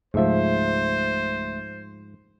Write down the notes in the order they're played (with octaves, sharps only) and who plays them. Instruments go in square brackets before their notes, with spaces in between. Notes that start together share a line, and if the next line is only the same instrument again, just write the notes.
[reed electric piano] C#2 A3 E5 [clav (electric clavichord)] G#2 F3 [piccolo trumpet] C5